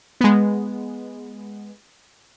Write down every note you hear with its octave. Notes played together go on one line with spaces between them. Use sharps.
G#3 B3